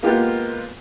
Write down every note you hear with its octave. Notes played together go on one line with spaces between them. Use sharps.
G#3 A#3 B3 F4 G4